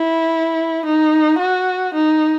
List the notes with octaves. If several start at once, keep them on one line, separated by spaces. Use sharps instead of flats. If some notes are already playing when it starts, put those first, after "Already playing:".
Already playing: E4
D#4
F#4
D#4